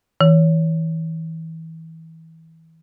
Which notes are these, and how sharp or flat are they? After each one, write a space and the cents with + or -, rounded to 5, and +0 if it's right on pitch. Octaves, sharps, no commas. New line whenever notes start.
E3 -30